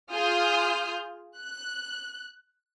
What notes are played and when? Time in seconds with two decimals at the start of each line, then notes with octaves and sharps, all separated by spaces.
0.12 F4 G#4 D#6 F6 G6
1.38 F#6